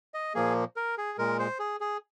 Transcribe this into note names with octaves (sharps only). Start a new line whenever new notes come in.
D#5
A#2 F3 A#3 G#4
A#4
G#4
A#2 G#3 A#4
C5
G#4
G#4